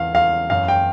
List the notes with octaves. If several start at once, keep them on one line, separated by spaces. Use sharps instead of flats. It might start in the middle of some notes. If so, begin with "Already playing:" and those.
Already playing: E2 F5
E2 F5
F#2 F5
G5